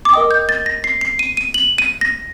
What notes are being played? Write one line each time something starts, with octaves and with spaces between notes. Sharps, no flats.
D6
A#4 D#5 G5 D#6
G6
A6
A#6
C7
C7
D#7
D#7
F#7
D#7
A#6